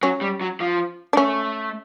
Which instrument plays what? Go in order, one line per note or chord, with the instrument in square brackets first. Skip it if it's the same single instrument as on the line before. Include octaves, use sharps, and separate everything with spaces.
[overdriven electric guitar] F#3 [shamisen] C#4
[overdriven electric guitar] G3
F#3
F3
[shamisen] D4
[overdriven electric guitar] A3 [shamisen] C#4